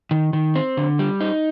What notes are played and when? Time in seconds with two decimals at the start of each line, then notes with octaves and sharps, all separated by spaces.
0.11 D#3
0.33 D#3
0.56 C4
0.77 D3
0.99 G3
1.21 D#4